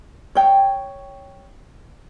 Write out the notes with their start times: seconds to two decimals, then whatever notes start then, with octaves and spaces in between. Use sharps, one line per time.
0.35 C#5 G5